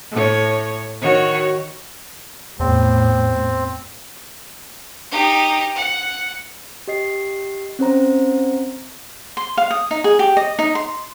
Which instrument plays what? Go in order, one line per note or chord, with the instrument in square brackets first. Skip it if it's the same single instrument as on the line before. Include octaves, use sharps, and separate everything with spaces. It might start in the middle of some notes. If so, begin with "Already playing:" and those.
[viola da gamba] A2 C#5
D#3 F#4 C#5
[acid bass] E2 [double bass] A2 [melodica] C4
[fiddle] D#4 G4
F#5
[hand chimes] G4 D#5 C7
C4 C#4 C5 A#5
[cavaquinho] C6
F5
D#6
D#4
G#4
G4
D#5
D#4
C6